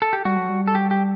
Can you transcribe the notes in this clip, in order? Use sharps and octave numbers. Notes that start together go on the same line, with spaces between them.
A4
G4
G3 F#4
F#3
G3
A4
G4
G4